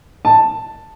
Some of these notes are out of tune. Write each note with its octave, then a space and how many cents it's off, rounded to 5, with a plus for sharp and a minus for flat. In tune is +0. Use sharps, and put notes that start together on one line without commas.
A5 +5